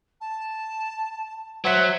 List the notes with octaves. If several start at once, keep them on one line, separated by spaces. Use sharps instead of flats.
A5
F#3 C5 E5 F#5 B6